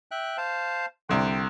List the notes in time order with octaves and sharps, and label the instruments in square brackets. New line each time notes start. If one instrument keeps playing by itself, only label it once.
[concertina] E5 G5 F#6
C5 F5 A5
[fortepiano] C2 D3 [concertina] G5